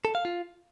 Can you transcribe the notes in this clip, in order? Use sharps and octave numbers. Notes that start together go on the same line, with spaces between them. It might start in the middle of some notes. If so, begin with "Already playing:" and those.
A4
F5
F4